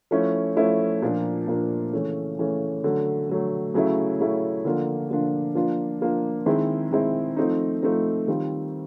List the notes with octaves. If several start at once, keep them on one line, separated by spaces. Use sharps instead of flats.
F3 A3 C#4 E4
F3 A3 C#4 E4
A#2 F3 A#3 D4
A#2 F3 A#3 D4
C#3 E3 A3 C#4
C#3 E3 A3 C#4
D3 F#3 A3
D3 F#3 A3
C#3 F#3 A3 C#4 E4
C#3 F#3 A3 C#4 E4
D3 F3 A#3 D4 F4
D3 F3 A#3 D4 F4
F3 A#3 D4 F4
F3 A#3 D4 F4
D#3 G#3 C4 E4
D#3 G#3 C4 E4
F3 A3 C4 D#4
F3 A3 C4 D#4
D#3 G3 C4 F4